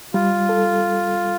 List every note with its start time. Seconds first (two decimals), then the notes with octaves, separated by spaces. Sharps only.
0.14 G3 F4
0.49 A4